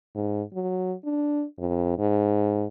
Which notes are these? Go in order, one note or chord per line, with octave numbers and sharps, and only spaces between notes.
G#2
F#3
D4
F2
G#2